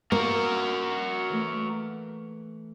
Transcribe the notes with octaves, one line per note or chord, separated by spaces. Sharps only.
A#3 F#4 A#4
E3 A3